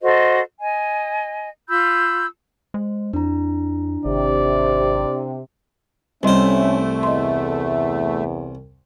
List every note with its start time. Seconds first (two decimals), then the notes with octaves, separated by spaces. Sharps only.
0.02 F#4 A4 C5 D#5
0.59 D#5 G#5
1.69 F4 B5 E6 G6
2.74 G#3 C5
3.13 F2 D4 E4 A#5
4.05 G#1 C3 D5
6.23 C2 G3 A3 C#4 C5 D#5 C6
7.03 E2 D#5 C6